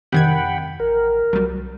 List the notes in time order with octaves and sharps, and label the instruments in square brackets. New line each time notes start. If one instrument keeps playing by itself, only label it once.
[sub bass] F2 [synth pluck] C3 D#3 G#6 [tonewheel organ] F#5 G5 B5
[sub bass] A1 [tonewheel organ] A#4
[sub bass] C2 [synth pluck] F#3 G3